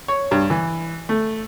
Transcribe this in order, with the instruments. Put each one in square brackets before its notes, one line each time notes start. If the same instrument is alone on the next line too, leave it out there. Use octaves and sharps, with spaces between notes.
[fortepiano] C#5
G2
E3
A3